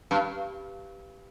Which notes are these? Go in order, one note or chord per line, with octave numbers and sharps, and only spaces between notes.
G2